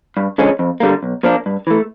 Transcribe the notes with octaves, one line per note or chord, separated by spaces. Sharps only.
G2
D3 F3 G#3 C#4
F2
D3 G3 A#3
B1
A#2 F3 A#3 D4
G2
E3 A3